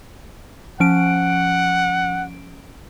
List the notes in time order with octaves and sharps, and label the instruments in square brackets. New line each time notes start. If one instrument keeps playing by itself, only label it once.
[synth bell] F3 C#4 D7 [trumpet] F#5